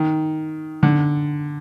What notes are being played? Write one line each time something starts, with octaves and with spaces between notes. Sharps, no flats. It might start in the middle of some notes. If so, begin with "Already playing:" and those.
Already playing: D#3
D3